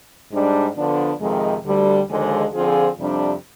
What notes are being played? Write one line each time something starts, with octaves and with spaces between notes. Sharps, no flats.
G#2 G3 D4
D3 F3 B3 D4
F2 C3 D#3 G#3
D2 D3 G3
D#2 D3 F3 G#3
D3 F3 C4 F4 G#4
F2 C3 G3 D4